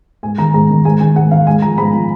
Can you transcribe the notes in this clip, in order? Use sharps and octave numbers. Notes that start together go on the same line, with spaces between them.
G#2 G#5
D#3 A#5
G#2 A#5
D#3
G#2 G#5
D#3 G#5
G#2 F#5
D#3 F5
G#2 G#5
F3 A#5
G#2 B5
F3